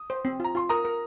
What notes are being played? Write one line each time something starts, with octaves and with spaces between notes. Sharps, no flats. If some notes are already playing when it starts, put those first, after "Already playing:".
Already playing: D#6
C5
C4
F4 A#5
F4 C6
A#4 A#5 D#6
A#4